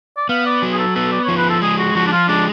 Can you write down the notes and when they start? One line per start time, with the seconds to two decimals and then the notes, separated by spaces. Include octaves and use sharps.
0.17 D5
0.29 B3 F5
0.46 D5
0.62 F#3
0.73 G#4
0.79 A4
0.96 B3 A4
1.12 D5
1.25 F3 C#5
1.37 B4
1.50 A4
1.62 G#3 G#4
1.78 F#4
1.95 F3 F#4
2.07 D4
2.12 F4
2.28 G#3 D4